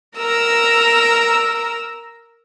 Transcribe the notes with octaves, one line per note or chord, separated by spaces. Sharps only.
A#4 A#5 E6